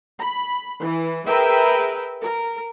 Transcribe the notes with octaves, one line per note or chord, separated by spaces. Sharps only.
B5
E3
G#4 A#4 B4 E5 G5
A#4